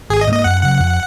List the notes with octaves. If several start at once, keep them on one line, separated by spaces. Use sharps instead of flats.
G#1 G#4
D#5
G#2 F3 A#3 D#5
F#2 F#5
C#3 F#3 F#5
F2